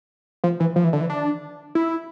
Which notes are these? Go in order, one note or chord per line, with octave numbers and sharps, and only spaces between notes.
F3
E3
F3
E3
D3
E3
D4
E4